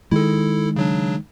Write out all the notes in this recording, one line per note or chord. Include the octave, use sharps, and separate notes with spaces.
D#3 G#3 E4 A4
C#3 F#3 D4